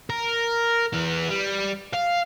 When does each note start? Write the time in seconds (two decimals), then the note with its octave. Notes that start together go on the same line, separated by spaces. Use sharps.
0.10 A#4
0.94 E3 B3
1.30 G3
1.93 F5